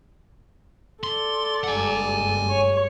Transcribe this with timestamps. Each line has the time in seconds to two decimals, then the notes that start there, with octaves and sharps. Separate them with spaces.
1.04 A4 D5 C6
1.64 F#1 G2 G#3 F#5 G#5
2.51 C#5